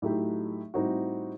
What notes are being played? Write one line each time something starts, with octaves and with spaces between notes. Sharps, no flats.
A2 F#3 A3 D#4 G4
A2 G3 C4 D#4 F#4